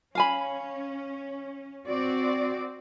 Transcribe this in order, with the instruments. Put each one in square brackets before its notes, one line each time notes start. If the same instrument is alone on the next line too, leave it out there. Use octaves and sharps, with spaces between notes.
[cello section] C#4 [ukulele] F5 G#5 B5
[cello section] C4 F#4 D5